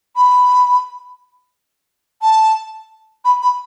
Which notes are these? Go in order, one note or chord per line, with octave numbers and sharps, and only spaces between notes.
B5
A5
B5
B5